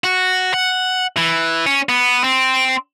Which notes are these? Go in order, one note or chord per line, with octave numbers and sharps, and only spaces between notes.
F#4
F#5
E3
C#4
B3
C4